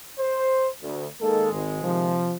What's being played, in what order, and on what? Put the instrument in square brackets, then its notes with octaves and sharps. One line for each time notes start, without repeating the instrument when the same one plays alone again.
[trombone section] C5
D2
[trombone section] D#3 G#3 [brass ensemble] A#3 D#4 A4
[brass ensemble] G#1
C3 F3